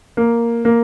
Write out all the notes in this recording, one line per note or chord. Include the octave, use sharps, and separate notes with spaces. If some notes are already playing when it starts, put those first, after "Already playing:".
A#3
A#3